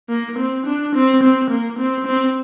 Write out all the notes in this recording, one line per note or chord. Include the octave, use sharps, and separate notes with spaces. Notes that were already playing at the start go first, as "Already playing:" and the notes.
A#3
C4
D4
C4
C4
A#3
C4
C4